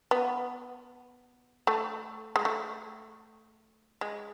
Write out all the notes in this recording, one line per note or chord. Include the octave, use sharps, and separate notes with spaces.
B3
A3
G#3
A3
G#3